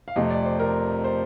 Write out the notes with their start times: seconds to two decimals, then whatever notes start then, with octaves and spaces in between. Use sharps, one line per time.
0.08 F5
0.16 F2 C3 F3 A3 D#5
0.31 D5
0.45 C5
0.60 A#4
1.04 C5